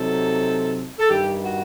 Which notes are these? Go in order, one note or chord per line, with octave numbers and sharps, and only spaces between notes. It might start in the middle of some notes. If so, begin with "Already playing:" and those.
Already playing: C3 F#3 C4 D#4 A4
A4
G2 D#3 G3 G4
F#4